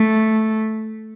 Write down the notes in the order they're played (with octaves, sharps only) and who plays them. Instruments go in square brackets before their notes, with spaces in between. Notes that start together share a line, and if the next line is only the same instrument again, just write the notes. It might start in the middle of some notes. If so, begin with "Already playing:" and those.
Already playing: [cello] A3